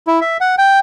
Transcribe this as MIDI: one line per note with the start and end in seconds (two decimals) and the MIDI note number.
0.07 0.20 64
0.21 0.37 76
0.41 0.55 78
0.58 0.80 79